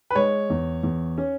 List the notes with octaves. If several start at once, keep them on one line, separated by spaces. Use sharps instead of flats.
B4
G#3 C#5
E2
E2
C#4